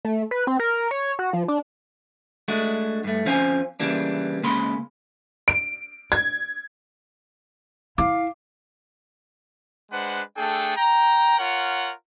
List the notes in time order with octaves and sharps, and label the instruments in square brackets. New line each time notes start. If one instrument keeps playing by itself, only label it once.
[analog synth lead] A3
B4
C4
A#4
C#5
F#4
F3
D4
[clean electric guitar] G#3 A3 D4 F#4
G2 A3
F2 C#4 C5 F5 G#5
C#3 E3 G3 A#3 D4
C#3 G#3 A#3 B5 C6
[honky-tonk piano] D7
G#6
[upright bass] E4 [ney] F5 [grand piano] D6
[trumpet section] G#3 D4 B4 C5 F#5
A3 D4 G#4 A4 G5
G5 A#5
F4 A#4 C#5 F#5